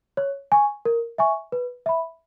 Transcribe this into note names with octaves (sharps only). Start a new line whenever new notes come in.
C#5
G#5 C#6
A#4
E5 G#5 C#6
B4
E5 B5